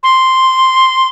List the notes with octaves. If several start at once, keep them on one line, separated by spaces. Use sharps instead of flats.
C6